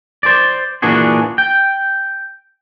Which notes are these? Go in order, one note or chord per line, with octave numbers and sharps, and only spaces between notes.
C5 D5
A#2 E3 D4 F#4 G#4
G5